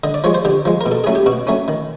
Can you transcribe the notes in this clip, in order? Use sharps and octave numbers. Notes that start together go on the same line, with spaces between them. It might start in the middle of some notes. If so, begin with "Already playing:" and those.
D3 D#5
D5
F3 G#3 C#5
C5
D3 G4
F3 G#3
A#4
B2
A4
F#3 A3 C#4 G#4
G4
B2 F#4
F#3 A3 C#4
D#3